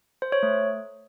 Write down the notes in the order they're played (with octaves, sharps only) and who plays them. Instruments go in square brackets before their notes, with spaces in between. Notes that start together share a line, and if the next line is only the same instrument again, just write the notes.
[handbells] C5
C#5
A3